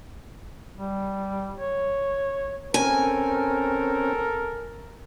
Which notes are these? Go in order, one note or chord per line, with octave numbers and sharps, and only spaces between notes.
G3
C#5
C4 C#4 A4 A#4 G#5